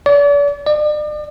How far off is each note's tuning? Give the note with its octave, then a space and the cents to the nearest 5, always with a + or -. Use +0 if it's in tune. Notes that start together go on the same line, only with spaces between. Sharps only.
D5 -40
D5 +40